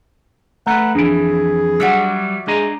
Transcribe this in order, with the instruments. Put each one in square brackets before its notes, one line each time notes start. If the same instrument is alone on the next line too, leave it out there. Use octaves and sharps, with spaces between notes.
[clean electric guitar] A3 B4 [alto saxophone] F#5 [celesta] A#5
[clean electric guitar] F2 E3 [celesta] D4 D7 [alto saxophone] G#4
[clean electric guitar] F#3 G3 [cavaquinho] F#4 D5 E5
[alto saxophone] G#3 [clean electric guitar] D4 G#5 A#5